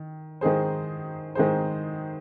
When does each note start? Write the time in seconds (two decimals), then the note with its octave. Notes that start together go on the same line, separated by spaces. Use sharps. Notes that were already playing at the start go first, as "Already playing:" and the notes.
Already playing: D#3
0.41 D#3 G#3 D#4 G#4 C5
1.35 D#3 G#3 D#4 G#4 C5